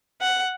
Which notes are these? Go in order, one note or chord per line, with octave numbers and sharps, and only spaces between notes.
F#5